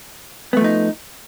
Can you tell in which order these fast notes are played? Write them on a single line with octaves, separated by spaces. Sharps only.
B3 A3 F3 D#4